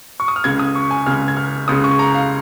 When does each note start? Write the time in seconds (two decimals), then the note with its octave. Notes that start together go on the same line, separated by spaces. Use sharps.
0.20 C#6
0.28 D#6
0.36 F6
0.44 C#2 C#3 G#6
0.59 D#6
0.75 C#6
0.91 G#5
1.06 C#2 C#3 F6
1.28 G#6
1.37 F6
1.68 C#2 C#3 D#6
1.84 C#6
1.99 A#5
2.15 F5